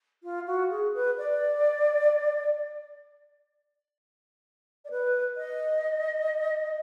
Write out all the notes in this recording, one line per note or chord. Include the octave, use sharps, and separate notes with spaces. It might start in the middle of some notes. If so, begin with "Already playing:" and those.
F4
F#4
G#4
B4
D5
D5
B4
D#5